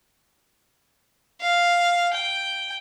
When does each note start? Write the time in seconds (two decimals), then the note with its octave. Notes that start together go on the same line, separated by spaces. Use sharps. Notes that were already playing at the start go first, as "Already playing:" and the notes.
1.41 F5
2.14 G5